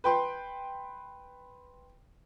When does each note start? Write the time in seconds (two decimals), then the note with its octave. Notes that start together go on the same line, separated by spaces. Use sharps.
0.04 B4 G5 C6